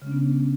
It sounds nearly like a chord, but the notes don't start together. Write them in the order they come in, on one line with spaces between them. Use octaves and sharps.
C#3 G#3 C#4 D4 B3